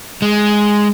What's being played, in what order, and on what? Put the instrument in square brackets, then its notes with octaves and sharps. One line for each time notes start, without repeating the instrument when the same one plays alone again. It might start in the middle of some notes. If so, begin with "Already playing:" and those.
[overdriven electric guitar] G#3